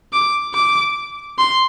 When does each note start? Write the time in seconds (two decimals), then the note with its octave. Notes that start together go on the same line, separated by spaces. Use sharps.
0.13 D6
0.54 D6
1.38 C6